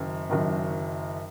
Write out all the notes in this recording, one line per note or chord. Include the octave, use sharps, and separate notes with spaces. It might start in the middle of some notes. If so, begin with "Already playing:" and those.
Already playing: F#1 F#2 D#3
F#1 F#2 D#3